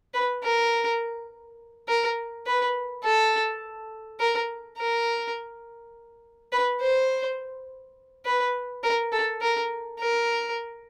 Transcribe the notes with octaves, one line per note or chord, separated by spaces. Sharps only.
B4
A#4
A#4
B4
A4
A#4
A#4
B4
C5
B4
A#4
A4
A#4
A#4